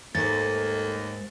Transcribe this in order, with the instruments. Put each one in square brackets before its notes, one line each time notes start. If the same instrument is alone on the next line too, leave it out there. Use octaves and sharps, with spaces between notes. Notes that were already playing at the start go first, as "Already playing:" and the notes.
[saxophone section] D#2 [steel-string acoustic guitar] G#2 [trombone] A3 [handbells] A6